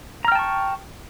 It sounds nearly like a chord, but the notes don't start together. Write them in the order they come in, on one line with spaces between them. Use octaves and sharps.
A#5 F6 G5 A5 C#6